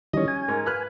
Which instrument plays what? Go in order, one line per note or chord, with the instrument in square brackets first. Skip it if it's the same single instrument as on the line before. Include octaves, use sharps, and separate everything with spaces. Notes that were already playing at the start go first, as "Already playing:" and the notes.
[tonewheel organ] D#3 E3 G3 [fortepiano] C#4 D#5
[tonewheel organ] G#5
[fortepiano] G#2 A#4
B4 F6 F#6